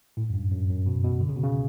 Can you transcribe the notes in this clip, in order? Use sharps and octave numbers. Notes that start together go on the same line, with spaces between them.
A2
F#2
G2
F#2
F#2
B2
B2
D3
C#3
B2
C#3